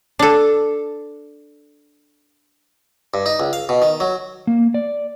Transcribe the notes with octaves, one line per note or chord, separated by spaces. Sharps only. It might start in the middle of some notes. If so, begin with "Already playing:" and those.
D4 A4
G2
D#4
C#2
F5
B2
D#3
F#3
A#3
D5